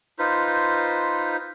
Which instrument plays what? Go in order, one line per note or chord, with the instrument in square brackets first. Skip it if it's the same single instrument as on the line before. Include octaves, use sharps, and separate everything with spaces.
[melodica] D#4 F4 B4 C5